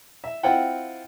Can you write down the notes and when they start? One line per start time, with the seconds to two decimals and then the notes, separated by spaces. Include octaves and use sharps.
0.24 E5
0.43 C4 E4 F4 F#5 G5